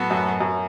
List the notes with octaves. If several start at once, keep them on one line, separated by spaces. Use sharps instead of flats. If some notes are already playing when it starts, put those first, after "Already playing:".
Already playing: A2 F#3 B3 F#4 A4
F#2
F#2